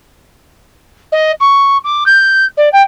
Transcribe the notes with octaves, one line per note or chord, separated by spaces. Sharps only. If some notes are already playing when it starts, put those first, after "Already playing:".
D#5
C#6
D6
G6
D5
G5